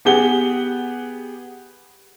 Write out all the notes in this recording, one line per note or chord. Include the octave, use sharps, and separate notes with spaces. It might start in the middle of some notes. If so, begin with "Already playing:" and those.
B3 G4 G#4 F#5 G7